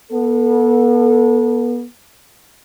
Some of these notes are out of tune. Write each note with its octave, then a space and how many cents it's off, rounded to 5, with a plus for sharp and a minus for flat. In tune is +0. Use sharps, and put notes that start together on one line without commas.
B3 -35 A4 +0